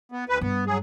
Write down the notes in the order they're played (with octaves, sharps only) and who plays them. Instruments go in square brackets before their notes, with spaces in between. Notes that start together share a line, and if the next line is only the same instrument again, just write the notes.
[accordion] B3
D2 B4
[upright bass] G2 [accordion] B3
[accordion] F#3 G#4